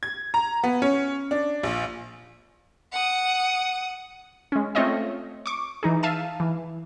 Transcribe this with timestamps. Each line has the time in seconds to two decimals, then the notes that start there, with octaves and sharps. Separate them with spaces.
0.03 G#6
0.34 A#5
0.63 B3
0.82 C#4
1.31 D4
1.63 A#1
2.92 F#5 D#6
4.52 G#3 C#4
4.75 A3 C4 F4 C#5 D#5 E5
5.46 C#6 D6
5.83 E3 D#4 G#4
6.03 E5 F5 A5 D#7
6.40 E3